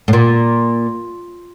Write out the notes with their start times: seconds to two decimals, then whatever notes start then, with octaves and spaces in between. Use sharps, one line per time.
0.08 A2
0.13 A#2